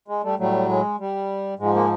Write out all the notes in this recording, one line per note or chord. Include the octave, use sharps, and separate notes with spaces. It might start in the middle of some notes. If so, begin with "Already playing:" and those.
G#3
G3 A3
A2 F#3 G3 A3
G#3
G3
G#2 F3 G#3
G#3 A#3